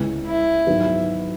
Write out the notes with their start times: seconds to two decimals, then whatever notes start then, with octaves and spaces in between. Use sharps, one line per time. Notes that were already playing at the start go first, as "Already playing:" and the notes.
Already playing: C#2 C#3 G#3 B3 E4
0.26 E4
0.67 G#2 D#3 F#3 B3